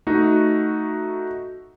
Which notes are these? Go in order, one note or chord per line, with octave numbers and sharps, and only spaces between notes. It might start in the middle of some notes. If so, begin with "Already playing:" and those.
A3 D#4 F#4